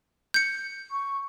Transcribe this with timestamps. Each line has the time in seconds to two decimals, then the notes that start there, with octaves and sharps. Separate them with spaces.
0.34 G6 C#7
0.91 C#6